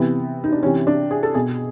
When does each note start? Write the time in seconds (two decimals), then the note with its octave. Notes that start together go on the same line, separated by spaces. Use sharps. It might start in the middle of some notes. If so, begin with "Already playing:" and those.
Already playing: C3 E3 B3
0.44 D#4
0.52 D4
0.63 C3 E3 C#4
0.87 D4
1.11 G#4
1.23 A4
1.34 B2 G#4